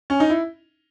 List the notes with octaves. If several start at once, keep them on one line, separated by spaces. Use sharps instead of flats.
C#4
D#4
E4